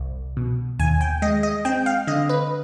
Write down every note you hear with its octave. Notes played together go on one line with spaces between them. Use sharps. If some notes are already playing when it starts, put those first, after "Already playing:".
Already playing: C2
B2
D#2 G#5
G5
G#3 D#5
D#5
C4 G5
F5
D3 D#5
B4